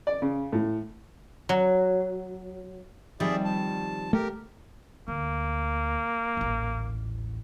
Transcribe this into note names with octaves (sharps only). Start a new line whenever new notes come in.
D5
C#3
A2
F#3
D#3 F3 G3 C4 G#4 D5 E5
A5
A3 G4 A#4
D2 A#3
D#1 A1